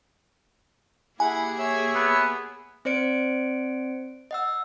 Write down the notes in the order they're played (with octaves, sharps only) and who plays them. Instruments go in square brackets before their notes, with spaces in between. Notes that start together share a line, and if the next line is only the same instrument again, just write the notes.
[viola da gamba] A#3 G4 G#4 [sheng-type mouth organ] E4 F#5 [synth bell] G#5
[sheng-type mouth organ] C#5 E5 E6
[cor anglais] B3
[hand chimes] C4 C5 D5 C#7 D7
D#5 F#5 E6